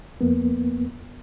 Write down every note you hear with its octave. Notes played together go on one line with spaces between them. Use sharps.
F2 A#3 B3